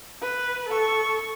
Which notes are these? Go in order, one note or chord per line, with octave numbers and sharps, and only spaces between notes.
B4
A4 C#6